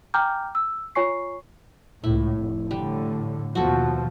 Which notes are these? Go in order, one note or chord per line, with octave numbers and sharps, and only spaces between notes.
G5 G#5 A#5 D6 F6 G6
E6
F4 C#5 G#5 C#6 C7
C#2 A2 E4
F1
A2 D3 G3
D#2 B2 F3 F#4 A4